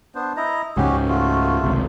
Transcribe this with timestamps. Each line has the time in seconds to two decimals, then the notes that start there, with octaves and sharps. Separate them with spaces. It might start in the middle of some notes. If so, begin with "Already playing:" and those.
0.15 B3 D4 C5
0.37 E4 D#5 A#5
0.77 C#2 G#2 C#3 C#4 F#4 G4
1.09 A3 F4 F#4
1.64 G#1 C#2 C3